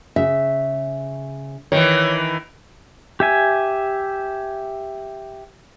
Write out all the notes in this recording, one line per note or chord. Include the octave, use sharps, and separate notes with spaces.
C#3 E5
D#3 E3 C#5
G4 E5 G#5